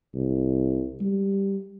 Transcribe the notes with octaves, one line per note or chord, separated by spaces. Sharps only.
C2
G3